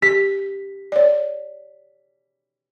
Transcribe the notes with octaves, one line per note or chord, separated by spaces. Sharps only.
G4 B6
C#5 D5